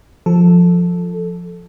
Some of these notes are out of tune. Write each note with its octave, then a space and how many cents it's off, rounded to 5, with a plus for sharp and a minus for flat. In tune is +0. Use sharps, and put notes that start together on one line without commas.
F3 +0 A4 -5